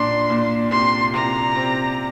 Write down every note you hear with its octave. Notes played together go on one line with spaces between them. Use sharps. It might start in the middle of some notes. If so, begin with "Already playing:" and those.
Already playing: A#2 D4 C6
A#2
C3 C6
C3 A#5
C4